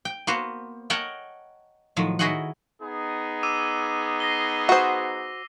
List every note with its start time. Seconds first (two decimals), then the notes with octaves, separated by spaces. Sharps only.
0.05 G5
0.27 A#3 B3 F#4 C5
0.90 A#4 C#5 D#5 F#5 G5 A5
1.96 A2 D#3 F3 F#3
2.19 D#3 E4 F#4 G#4 D#5 F#5
2.81 B3 D#4 G#4
3.43 D6 E6 D#7
4.20 A#6 C7 G7
4.69 F#4 C5